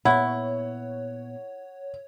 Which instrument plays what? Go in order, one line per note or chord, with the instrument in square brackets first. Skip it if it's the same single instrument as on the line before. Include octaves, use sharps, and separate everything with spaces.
[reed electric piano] A#2 B3 [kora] E4 [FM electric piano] C#5 [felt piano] F#5